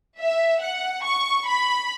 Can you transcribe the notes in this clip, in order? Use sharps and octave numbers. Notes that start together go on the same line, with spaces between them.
E5
F#5
C#6
B5